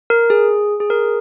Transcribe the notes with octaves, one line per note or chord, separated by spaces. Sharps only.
A#4
G#4
G#4
A#4